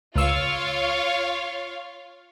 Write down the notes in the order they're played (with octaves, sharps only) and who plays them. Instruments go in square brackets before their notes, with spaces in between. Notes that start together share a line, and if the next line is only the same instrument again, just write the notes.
[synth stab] C#2 E6 [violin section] F4 C#5 F5